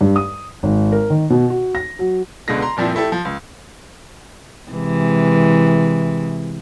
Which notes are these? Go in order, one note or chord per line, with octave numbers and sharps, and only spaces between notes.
G2
D#6
G#1
A#4
D#3
B2
F#4
A#6
F#3
C#2 B2 D3 G#3 A#6
A#5 C6
G2 A#2 F3 C4 E4
A3 E4 G4 A4
F3
C#2
C3 E3 G#3